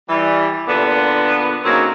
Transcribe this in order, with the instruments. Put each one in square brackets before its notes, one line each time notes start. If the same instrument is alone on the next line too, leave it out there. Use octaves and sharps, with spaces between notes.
[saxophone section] E3 G3
A#2 D3 B3
C#3 F#3 A#3 C4 D#4 C#5